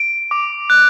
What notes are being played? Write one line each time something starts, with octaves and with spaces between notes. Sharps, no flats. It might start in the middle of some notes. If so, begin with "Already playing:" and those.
Already playing: D7
D6
F#6